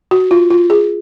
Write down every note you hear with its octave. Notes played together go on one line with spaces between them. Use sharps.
F#4
F4
F4
G#4